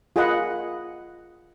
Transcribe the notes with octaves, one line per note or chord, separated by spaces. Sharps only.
F4 G#4 A#4 D#5 F#5 B5